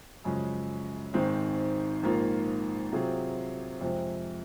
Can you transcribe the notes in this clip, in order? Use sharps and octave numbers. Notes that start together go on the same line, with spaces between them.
F#2 C#3 F3 G#3
G#1 G#2 D#3 G#3 C4
A#1 G#2 D#3 A#3 F4
C3 F#3 C4 F4 G#4
F2 C3 F3 G#3 C4